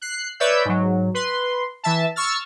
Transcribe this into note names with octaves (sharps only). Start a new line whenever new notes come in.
F#6 C7
B4 C#5 D5 E5 E6 G6
G#2 F#3
B4 C6
E3 E5 A5
C#6 E6 F6 A6